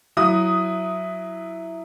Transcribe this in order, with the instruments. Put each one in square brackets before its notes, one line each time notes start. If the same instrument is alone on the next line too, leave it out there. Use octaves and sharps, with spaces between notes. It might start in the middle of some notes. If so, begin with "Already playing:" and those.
[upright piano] F#3 E4 D#6